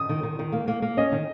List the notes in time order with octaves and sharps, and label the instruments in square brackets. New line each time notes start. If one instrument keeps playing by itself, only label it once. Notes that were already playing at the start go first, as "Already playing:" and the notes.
Already playing: [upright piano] D#6
[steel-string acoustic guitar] D#3
D#3
D#3
A#3
A#3
A#3
[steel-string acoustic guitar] C#4 [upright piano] D#5
[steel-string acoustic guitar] D#3